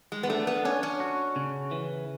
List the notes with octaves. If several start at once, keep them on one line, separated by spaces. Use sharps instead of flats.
G#3
B3
A3 D4
B3
C#4 D4
C#4
F#4
C#3
E3